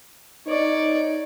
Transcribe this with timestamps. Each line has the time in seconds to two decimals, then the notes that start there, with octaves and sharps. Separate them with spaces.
0.47 D#4 C#5 D5